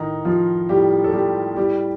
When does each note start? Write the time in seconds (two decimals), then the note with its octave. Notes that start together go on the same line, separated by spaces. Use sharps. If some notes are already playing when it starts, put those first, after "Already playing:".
Already playing: A2 D#3 D#4
0.25 F3 F4
0.69 A2 G3 G4
1.04 A4
1.12 G3 G4
1.56 A2 G3 G4